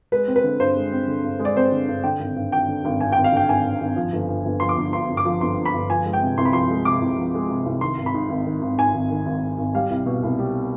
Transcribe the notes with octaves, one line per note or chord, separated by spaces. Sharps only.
G#3 B4
C4
B4
D3
G2 C5
G#3
C4
D3
G2
G#3
D5
C4 C5
D3
G2
D3 G5
G#1
G2
G#1 G5
D3
G#1
G2 G#5
G5
G#1
F5
D3 G5
G#1 G#5
G2
G#1
F3
G1
G2
G1
F3 C6
D6
G1
G2 C6
G1
D6
F3
G1 C6
G2
B5
G1
F3 G#5
G#3
G5
C3
C2 C6
B5
F3 C6
G#3
C3 D6
C2
F3
G#3
C3
C2
D#3 C6
G#1
B5
G#2
G#1
D#3
G#1
G#2 G#5
G#1
D#3
G#1
G#2
G#1
G3 F5
C2
B2
C2
G3